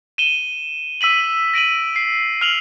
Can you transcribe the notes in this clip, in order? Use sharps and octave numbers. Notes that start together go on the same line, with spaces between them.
D#7 E7 G7
E6 B6 D#7 F#7
A#6 D7 D#7 F#7
C7
F6 F7 F#7